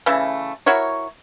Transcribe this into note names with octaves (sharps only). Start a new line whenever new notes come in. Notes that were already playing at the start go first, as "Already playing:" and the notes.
C#3 E3 A3 E5
E4 F#4 A#4 C#5